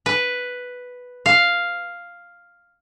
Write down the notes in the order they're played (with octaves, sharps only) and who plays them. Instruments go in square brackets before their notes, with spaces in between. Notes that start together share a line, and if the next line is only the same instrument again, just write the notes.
[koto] B4
F5